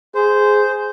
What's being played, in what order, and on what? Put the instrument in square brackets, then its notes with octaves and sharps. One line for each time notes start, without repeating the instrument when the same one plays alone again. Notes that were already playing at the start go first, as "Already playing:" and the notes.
[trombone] G#4 [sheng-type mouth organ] C5